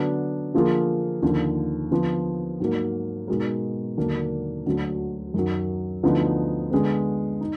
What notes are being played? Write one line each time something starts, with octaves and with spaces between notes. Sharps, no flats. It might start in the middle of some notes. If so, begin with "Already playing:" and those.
Already playing: D3 F#3 B3 D4
D3 F3 A#3 F4 G#4
D#2 D3 F3
D3 F3 B3
G#2 F#3 A#3
B2 G#3 D#4 F#4 A#4
D#2 D3 F#3 A#3 D4
D2 D3 F#3
F#2 D#3 F#3
D2 D3 F3 B3 D#4
D3 G#3 B3
D#4